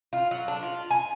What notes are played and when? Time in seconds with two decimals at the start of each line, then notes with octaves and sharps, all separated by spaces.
0.13 F4
0.31 F#3
0.48 D4
0.63 F4
0.91 G#5